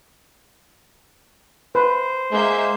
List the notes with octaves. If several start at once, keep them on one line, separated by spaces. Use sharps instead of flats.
B4 C5
G#3 A#3 E5 G6